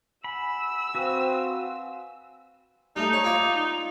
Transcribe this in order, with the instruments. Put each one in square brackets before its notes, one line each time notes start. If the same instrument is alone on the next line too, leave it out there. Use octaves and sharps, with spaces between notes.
[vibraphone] F#5 G#5 [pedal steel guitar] B5 [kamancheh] E6
[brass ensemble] C4 [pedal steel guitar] F#4 B4 [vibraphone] F5 G#5
[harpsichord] G3 A3 [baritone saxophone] D#4
[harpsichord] C#5
E4 F4 D5